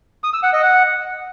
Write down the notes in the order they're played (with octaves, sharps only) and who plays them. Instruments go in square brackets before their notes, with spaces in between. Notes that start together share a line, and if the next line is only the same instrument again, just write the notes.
[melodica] D#6
E6
F#5
D#5
F#5